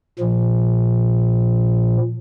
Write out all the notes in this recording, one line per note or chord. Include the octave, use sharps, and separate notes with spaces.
A#2 F3